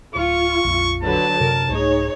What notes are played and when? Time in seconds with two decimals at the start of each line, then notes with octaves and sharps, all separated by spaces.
0.16 D1 F4 C#6
0.64 A#1 F2
1.03 D3 F#3 B4 A5
1.40 F#2 C3 A#4
1.69 C2 G#2 A3 D#4 G#4 C#5